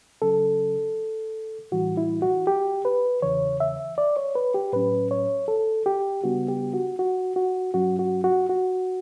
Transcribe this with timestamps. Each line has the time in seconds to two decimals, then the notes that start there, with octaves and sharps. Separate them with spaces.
0.22 C#3 F#3 C#4 A4
1.72 A2 E3 G3 F#4
1.97 E4
2.22 F#4
2.47 G4
2.85 B4
3.22 E2 C#3 E3 C#5
3.60 E5
3.98 D5
4.16 C#5
4.36 B4
4.54 G4
4.73 A2 F#3 C#4 B4
5.11 C#5
5.48 A4
5.86 G4
6.24 C#3 G3 B3 D4 F#4
6.49 G4
6.74 F#4
6.99 F#4
7.36 F#4
7.74 G2 F#3 C#4 F#4
7.99 F#4
8.24 F#4
8.49 F#4